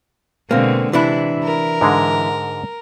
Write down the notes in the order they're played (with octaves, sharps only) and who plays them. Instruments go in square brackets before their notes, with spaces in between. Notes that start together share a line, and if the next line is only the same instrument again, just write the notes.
[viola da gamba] B2 D3 G#3 [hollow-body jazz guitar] A#3 C4
[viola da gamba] C3 [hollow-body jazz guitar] E3 D4 E4
[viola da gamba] A#4
[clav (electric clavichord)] G#2 D3 G#3